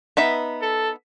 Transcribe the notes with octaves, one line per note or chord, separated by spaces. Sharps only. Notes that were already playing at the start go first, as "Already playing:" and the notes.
B3 D#4 E5
A4